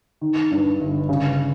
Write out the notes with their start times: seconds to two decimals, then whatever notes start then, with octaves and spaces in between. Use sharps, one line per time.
0.21 D#3
0.51 G2
0.79 G1
1.09 C#3